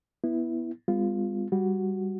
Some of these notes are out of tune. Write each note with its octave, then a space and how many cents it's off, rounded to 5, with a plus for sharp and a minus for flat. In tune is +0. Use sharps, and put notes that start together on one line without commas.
B3 -10 E4 +0
G#3 -45 B3 +45 F4 +0
G3 +0 F#4 +0